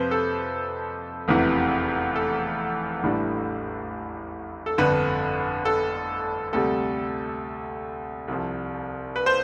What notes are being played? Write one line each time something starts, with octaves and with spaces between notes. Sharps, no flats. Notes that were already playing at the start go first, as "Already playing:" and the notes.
Already playing: F2 C3 F3 B4 C5
A4
F1 E2 C3 E3
A4
A1 A2 E3 G3 D4
A4
G1 F2 D3 B4
A4
D2 C3 G3 A4
C2 C3 F3
B4
C5